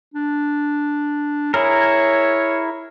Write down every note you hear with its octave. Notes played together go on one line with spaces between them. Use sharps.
D4
E4 G#4 A#4 C#5